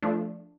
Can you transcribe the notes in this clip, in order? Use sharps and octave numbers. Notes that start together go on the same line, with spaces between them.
F3 A3 D4